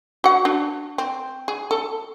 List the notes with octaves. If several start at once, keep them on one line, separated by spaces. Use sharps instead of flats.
F#4 F#5
D4
C4
G#4
A4